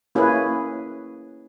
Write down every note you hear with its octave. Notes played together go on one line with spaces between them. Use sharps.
A#3 C#4 E4 G#4 B4